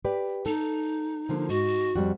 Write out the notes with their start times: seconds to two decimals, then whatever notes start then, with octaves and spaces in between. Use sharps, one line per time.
0.05 G4 B4 D5
0.46 D#4 A4
1.29 D3 F3 A#3
1.49 G#2 F#4
1.96 F2 G3 F#4